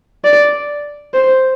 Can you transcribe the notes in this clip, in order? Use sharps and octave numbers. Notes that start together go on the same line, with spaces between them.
D5
C5